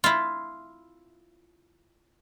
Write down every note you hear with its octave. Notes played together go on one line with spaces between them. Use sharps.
E4 F4